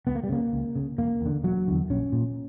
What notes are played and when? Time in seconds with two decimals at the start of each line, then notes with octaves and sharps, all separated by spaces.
0.07 C#2 B3
0.15 A#3
0.24 G3
0.29 C#3 A#3
0.53 C#2
0.75 C#3
0.98 E1 A#3
1.21 E2 D3
1.43 E1 F#3
1.67 E2 D3
1.90 A#1 C#4
2.12 A#2